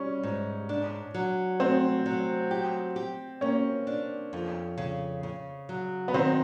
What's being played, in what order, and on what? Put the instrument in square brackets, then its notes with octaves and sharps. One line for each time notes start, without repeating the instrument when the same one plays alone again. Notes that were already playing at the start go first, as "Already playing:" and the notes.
Already playing: [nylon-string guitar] G3 [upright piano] C#4
[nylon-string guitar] G#2
D4
F#3
[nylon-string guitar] A3 [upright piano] C4
[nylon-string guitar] F#3
G4
G4
[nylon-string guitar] A#3 [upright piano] C#4
[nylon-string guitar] D4
F2
C#3
C#3
F#3
[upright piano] B3
[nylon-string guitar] D#3 [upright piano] C4